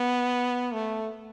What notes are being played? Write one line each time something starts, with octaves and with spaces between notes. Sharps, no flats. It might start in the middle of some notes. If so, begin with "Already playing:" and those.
Already playing: B3
A3